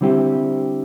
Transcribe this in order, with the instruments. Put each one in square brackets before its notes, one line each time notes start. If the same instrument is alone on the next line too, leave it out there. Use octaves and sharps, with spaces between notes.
[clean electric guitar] D3 G3 C4 E4 G4